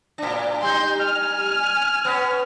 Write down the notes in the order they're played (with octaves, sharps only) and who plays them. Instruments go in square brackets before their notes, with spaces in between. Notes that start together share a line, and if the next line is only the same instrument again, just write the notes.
[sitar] A2 D4
[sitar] G3 D#4 [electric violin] C6 G6
[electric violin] G#5 F6
[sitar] B3 C#4